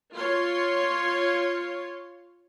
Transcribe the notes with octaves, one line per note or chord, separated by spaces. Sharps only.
F4 C#5 C6